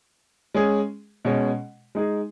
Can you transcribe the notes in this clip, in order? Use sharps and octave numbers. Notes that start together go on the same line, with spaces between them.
G#3 C#4 G#4
B2 G#3 C#4
G#3 D#4 G#4